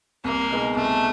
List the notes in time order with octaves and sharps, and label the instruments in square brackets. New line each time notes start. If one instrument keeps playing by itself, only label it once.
[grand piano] C2 [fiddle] A#3
[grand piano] B2 G#3 B3 D#4
[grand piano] C2 [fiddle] A3